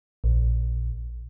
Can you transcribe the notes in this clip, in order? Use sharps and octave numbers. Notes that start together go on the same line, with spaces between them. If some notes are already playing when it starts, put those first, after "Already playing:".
A#1